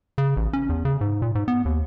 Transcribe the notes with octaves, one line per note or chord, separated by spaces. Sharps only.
C#3
A1
C#4
E2
C#3
G#2
A#2
G#2
B3
D#2